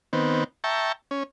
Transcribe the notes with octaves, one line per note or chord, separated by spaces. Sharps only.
D#3 B3 C4
E5 G5 A5 A#5 C#6
C#4